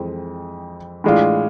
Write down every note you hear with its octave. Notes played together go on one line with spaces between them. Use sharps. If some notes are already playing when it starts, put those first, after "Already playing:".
Already playing: F2 E3 G#3 C4
A2 E3 G#3 D4 F4